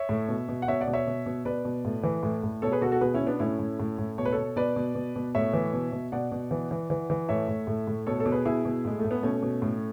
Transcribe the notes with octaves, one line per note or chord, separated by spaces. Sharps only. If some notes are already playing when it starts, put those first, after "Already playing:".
Already playing: C#5 E5
A2
B2
B2
F#5
B2 C#5 E5
D5 F#5
B2
C#5 E5
B2
B2
B2 B4 D5
B2
A2
E3
A2
A2
B2 A4 C#5
G#4 B4
B2 F#4 A4
F#4 A4
B2 G#4 B4
C#4 E4
B2
B3 D4
A2 C#4 E4
A2
A2
A2
B2 C#5
B4
B2 A4 C#5
B2 B4 D5
B2
B2
B2
A2 C#5 E5
E3
B2
B2
B2 D5 F#5
B2
E3
E3
E3
E3
A2 C#5 E5
A2
A2
A2
B2 A4 C#5
A4 C#5
B2
G#4 B4
B2 E4 G#4
B2
A2 G#3
A3
A2
B3
B2 A3 C#4
B2
A2